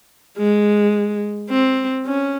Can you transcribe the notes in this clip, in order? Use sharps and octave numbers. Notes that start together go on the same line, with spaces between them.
G#3
C4
C#4